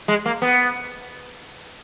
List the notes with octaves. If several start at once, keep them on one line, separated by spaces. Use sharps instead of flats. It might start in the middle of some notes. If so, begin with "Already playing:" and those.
G#3
A#3
B3